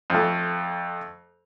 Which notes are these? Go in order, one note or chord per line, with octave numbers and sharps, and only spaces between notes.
F2 A3